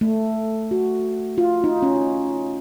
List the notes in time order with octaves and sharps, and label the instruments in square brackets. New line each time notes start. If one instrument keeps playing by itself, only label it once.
[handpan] A3
F#4
F4
D#4
C#4